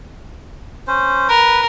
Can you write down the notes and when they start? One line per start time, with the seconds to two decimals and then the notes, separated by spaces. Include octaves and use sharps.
0.88 C#4 C5
1.28 A#4 B4